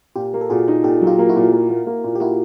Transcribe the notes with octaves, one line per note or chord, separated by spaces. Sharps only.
A#2 F4 G4
A#3
A4
A#2 F#4 G#4
D#4
A#2 G4 A4
F#3
F4 G4
A#3
E4 F#4
A#2
A#3
A#3
A#3
A#2
G4
A#3 E4 F#4